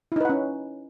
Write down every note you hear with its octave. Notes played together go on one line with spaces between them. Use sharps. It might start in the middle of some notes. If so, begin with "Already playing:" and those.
C#4 D#4 E4 B4 F#5